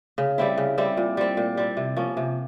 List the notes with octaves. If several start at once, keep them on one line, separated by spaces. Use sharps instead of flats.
C#3
G3 C4 E4
C#3
G3 C4 E4
A#2
G3 C4
A#2
G3 C4
C3
F3 A#3 C#4
C3